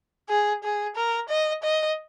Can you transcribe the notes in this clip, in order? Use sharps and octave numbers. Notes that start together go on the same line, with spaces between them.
G#4
G#4
A#4
D#5
D#5